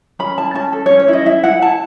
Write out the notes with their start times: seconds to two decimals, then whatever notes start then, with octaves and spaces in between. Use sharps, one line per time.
0.19 C#4 B5
0.37 E4 A5
0.55 C#4 A5
0.73 A4
0.86 C#5
0.91 C#4
1.00 C#5
1.08 E4
1.13 D#5
1.26 E4 E5
1.44 E4 F#5
1.62 E4 A5